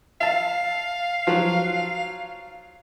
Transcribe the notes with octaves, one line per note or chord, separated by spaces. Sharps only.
E5 F5 A5
F3 F#3